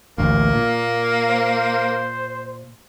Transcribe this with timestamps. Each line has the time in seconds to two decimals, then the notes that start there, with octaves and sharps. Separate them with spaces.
0.18 A1 D2 A#3
0.53 A#2
1.29 C5